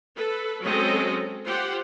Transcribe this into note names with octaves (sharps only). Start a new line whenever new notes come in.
A4 B4
F#3 G#3 C4 C#4 A4 D#5
F4 G4 C5 F#5